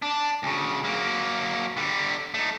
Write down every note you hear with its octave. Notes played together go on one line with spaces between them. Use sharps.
D4
D2 C#3
F#3 A#3
D3 G3
A3 D#4